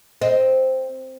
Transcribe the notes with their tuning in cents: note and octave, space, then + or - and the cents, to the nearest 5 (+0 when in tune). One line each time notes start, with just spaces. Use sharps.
C4 +0 D#5 +0